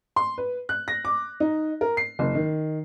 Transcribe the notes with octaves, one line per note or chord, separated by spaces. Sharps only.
C6
B4
F#6
A#6
D6
D#4
A#4
C7
F#1
D#3